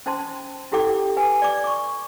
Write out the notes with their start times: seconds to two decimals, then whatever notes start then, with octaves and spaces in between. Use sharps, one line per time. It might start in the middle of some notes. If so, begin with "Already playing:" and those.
0.06 C#4 C5 A5 C6
0.71 C#4 E4 G4 A4 G5 D6
1.17 B4 G#5
1.42 D5 D6
1.64 C#6 D6